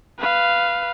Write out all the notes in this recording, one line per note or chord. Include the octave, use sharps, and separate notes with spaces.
B4 F5